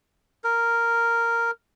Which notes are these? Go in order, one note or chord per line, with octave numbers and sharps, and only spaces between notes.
A#4